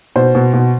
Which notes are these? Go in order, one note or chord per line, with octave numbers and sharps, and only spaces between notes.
B2 C5
B2
B2